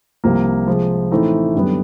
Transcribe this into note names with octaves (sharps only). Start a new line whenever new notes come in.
C2 C3 F3 A#3
C3 F3 G#3
A2 E3 A3 C4 D#4
F#2 D3 G3 B3